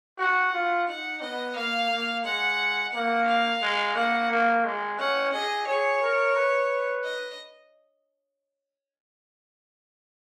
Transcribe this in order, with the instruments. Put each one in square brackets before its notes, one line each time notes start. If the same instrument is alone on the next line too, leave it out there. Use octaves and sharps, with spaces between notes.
[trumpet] F#4 [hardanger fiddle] F#5
[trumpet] F4
[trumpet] D#4 [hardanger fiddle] F#5
[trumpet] B3 [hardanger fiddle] D#5
[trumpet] A#3 [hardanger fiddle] F5
[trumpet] A#3
[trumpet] G#3 [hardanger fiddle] F#5
[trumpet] A#3 [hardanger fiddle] F#5
[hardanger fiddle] F5
[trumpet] G#3
[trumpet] A#3 [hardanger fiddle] F#5
[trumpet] A#3
G#3
[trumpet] C#4 [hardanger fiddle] F#5
[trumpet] G#4 [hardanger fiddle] D#5
[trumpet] G#4 [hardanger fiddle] C#5
[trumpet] A#4
B4
[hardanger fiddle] D#5